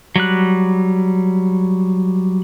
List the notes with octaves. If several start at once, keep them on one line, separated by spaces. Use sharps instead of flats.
F#3 G3 F#6